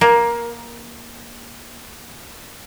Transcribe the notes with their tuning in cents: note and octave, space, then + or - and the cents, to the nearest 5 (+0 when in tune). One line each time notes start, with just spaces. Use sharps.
A#3 +15